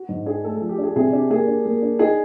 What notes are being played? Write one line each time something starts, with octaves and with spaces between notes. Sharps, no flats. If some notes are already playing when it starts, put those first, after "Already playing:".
Already playing: F#4
G#2
D4 G#4
A3 A4
F3 A4
G4
D4 G#4
C3 G#4
D4 G4
A#3 G#4
D4
A#3
D4
D#4 G#4